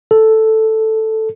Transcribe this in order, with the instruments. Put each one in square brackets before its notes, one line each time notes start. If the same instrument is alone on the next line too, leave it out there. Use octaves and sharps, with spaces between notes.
[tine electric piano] A4